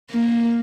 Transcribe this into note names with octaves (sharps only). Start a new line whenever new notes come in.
A#3